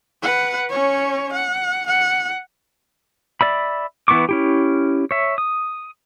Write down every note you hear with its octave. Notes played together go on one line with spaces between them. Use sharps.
B4 F#5
C#4 C#5
F#5
F#5
D5 E5 B5
E3 B3 E4 C#6 D6
C#4 E4 G4
C#5 E5
D#6